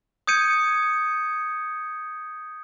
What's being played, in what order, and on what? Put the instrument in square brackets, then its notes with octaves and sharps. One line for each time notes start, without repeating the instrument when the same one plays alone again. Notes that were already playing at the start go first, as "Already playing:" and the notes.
[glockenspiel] D#6 G6 G#6 C#7 D#7